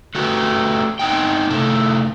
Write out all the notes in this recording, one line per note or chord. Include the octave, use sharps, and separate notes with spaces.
A3 F#4 G4 B4
B3 C4 D#4 G5
C3 A3 E4 A4